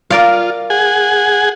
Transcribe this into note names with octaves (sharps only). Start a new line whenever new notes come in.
F4 A#4 D5 F5
G#4 F#5 G#5